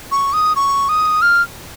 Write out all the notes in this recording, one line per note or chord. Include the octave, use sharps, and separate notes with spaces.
C#6
D#6
C#6
D#6
F6